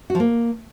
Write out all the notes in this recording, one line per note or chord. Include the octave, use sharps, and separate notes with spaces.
F#4
F3
A#3